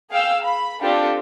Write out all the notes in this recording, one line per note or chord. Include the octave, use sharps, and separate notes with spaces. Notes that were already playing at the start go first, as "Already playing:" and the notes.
G#4 F5 G5 E6
B5
C4 D4 F4 G4 A4